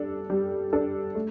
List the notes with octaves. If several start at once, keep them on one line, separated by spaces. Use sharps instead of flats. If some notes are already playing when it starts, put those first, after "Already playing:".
Already playing: G3 D4 A4
G3
D4 A4
A3